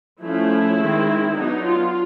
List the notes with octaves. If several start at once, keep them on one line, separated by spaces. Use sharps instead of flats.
F3 A3 C#4 E4
D#3 G#3 C4
F#3 B3 D4 D#4
F4